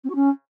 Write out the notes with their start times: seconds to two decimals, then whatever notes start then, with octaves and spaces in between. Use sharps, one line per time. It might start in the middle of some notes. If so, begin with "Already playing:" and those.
0.04 C4
0.10 F#4
0.15 C#4